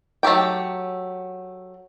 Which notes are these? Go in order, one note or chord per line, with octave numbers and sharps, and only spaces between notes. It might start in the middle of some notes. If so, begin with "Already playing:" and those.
F#3 A3 G4 G5